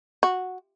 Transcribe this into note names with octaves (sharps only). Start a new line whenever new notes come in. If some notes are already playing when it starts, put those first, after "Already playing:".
F#4